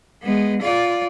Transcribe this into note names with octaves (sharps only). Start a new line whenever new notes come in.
G#3 B3
F4 D5